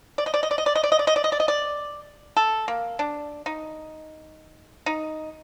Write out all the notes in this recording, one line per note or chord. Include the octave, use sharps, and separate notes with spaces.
D5
D#5
D5
D#5
D5
D#5
D5
D#5
D5
D#5
D5
D#5
D5
D#5
D5
D#5
D5
A4
A#3
D4
D#4
D#4